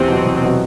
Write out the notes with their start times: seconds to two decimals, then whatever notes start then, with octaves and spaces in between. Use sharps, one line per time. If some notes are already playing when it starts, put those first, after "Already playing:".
Already playing: E2 C3 C4
0.08 B2 F#3
0.26 E2
0.42 B2 F#3